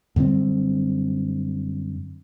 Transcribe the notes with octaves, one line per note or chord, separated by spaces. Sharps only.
F#2 D3 G3 C4